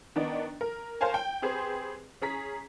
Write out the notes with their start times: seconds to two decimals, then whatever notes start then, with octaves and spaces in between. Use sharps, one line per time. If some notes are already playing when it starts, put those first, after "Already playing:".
0.16 D#3 B3 D4 D#4
0.61 A#4
1.01 A#4 C5 C#5 F5 G#5 A5
1.14 G5
1.42 C4 G4 G#4 B4 C5
2.22 C#4 G#4 A#5 B6